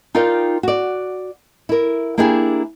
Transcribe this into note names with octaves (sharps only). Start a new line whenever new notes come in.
D#4 F4 A#4 D5 G5
F#4 D5
E4 A#4
A#3 D4 E4 G4 G#4